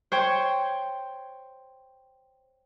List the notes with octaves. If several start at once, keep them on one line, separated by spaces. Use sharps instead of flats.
C5 C#5 G5 C6